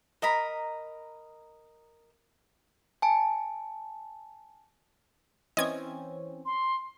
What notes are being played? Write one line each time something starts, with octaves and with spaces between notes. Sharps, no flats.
A#4 D#5 A#5 B5
G#5 A5
E3 C4 C#4 D#5 G#6
C6